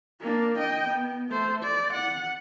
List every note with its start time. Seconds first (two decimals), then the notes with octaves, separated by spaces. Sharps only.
0.21 A#3 D4
0.58 D#5 G5
0.88 B3
1.30 A3 C5
1.63 D5
1.93 F#5